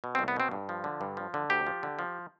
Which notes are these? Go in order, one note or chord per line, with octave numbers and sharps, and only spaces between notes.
B2
C4
C2
B3
B2 C4
G2
F3
D3
G2
F3
D3
D2 G4
F3
D3
F3